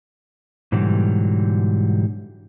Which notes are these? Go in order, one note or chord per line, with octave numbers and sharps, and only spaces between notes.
G#2 B2 D3 E3 F#3 G3